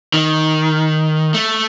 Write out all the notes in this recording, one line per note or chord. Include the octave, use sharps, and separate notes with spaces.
D#3
A3